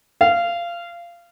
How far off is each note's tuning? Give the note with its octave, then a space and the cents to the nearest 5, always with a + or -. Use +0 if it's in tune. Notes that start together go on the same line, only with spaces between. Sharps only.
F5 -20